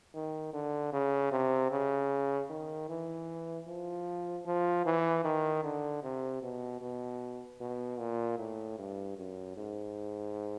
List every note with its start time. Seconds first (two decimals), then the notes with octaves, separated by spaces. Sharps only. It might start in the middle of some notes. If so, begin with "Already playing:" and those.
0.14 D#3
0.53 D3
0.93 C#3
1.32 C3
1.71 C#3
2.50 D#3
2.89 E3
3.67 F3
4.46 F3
4.86 E3
5.24 D#3
5.64 D3
6.03 C3
6.42 B2
6.81 B2
7.61 B2
7.99 A#2
8.38 A2
8.78 G2
9.17 F#2
9.57 G#2